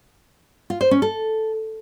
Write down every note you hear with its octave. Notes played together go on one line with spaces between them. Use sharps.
F4
C5
C#4
A4